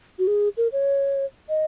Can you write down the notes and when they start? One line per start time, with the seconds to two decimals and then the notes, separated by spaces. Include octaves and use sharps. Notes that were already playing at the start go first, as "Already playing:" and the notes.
0.19 F#4
0.27 G#4
0.57 A#4
0.72 C#5
1.49 D#5